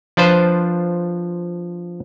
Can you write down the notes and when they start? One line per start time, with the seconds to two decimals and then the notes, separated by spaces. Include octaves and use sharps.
0.17 F3 D4 F4 B4 C5